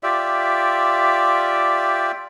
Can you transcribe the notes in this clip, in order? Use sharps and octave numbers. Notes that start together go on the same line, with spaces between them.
F4 G4 D5 E5